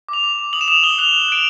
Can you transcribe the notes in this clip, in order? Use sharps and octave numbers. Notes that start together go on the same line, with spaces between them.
D6 F7
D6
D6
D#6 F#7
E7
D#6 F7
D#6 G7
F#6 F7
F#6
F#6 D7